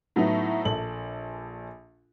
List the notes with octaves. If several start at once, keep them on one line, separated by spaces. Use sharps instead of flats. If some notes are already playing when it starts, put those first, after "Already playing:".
A2 F#3 A3 B3 D#4
A#1 A4 F#7